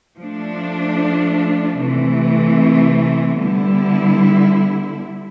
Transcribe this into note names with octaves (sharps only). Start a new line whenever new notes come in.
F3 A3 D4
C3 E3 A3
D3 G3 B3 E4